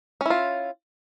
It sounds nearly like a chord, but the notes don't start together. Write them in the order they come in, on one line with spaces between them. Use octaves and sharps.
C#4 E4 F4